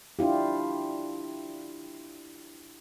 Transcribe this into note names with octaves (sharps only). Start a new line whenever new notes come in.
D4 E4 F4 G4